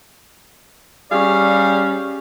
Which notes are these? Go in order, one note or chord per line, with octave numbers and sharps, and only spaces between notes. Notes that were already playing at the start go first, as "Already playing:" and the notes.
G3 C#4 G#4 D5 F5